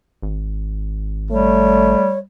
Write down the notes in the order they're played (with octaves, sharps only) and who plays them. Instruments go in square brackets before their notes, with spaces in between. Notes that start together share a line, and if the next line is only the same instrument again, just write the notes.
[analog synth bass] G#1
[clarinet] G3 [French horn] A3 [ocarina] C#5